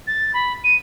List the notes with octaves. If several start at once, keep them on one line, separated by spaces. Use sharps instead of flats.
A6
B5
D#7